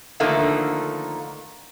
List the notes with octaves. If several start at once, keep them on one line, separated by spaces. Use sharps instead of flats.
D3 D#3 F3 A3 A#3 D#4